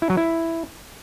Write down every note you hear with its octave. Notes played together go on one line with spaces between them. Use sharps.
E4
F#3
E4